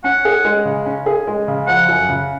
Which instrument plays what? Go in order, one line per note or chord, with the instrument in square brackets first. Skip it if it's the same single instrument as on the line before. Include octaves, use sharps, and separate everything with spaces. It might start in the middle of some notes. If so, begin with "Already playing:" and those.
[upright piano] C#4 [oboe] F#5
[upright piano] G#4
G#3
C#3
C#4
G#4
G#3
C#3
[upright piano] F3 [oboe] F#5
[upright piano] F#2
C#3